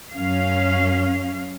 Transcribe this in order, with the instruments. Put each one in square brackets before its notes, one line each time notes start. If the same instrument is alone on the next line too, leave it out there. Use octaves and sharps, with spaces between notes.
[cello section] F#2 C#4 F5